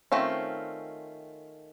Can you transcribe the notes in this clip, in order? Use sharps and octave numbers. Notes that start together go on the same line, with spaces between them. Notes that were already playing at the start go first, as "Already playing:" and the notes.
D#3 A3 C4 C#4 F4